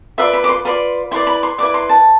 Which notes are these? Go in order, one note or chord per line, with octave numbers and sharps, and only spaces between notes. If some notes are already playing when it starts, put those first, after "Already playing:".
F4 B4 D5 E5
B5
D6
C6
F4 B4 D5
E4 B4 D5 C6
B5
C6
E4 B4 D5 D6
C6
A5